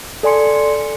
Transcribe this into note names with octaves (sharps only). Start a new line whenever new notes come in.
A4 D5 G#5 C6 C#7